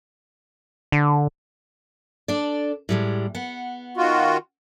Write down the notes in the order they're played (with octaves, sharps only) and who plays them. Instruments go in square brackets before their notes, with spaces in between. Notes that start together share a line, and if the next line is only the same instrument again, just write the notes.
[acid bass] D3
[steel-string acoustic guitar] D4 A4 D5
A2 G3 G#3
B3 F#5
[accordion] D#3 F4 F#4